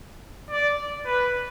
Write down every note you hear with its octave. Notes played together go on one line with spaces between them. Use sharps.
D5
B4